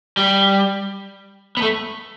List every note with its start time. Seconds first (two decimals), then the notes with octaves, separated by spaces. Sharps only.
0.17 G3
1.57 B3
1.62 A3